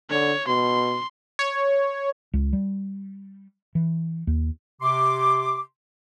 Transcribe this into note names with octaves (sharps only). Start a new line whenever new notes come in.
D3 C#5
B2 C6
C#5
C#2
G3
E3
D#2
C3 C6 D6